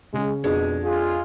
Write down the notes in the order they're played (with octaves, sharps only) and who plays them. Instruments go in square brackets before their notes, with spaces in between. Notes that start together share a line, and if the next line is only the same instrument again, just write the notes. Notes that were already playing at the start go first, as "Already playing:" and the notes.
[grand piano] C#3 C#4 [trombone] G#3
[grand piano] F2 D4 [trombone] B2 [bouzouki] G#3
[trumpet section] F4 [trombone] G#4